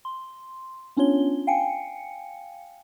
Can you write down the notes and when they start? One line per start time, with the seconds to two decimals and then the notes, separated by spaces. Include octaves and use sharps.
0.05 C6
0.97 B3 C#4 D4 F4 C#5 G7
1.47 F5 G5 G#5 C#7